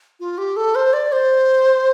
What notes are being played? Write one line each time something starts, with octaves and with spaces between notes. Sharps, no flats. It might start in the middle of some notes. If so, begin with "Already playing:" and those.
F4
G4
A4
C5
D5
C5